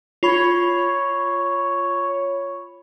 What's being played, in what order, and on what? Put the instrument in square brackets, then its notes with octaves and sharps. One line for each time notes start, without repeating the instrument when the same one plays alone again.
[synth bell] F4 B5 [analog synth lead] C#5